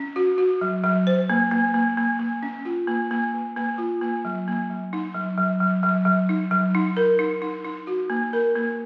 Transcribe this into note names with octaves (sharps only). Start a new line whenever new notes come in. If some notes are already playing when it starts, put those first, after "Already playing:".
Already playing: C#4
F#4
F#4
F#3
F#3
C5
A#3
A#3
A#3
A#3
A#3
C#4
F4
A#3
A#3
A#3
A#3
F4
A#3
F#3
A#3
F#3
D#4
F#3
F#3
F#3
F#3
F#3
D#4
F#3
D#4
A#4
D#4
D#4
D#4
F#4
A#3
A#4
A#3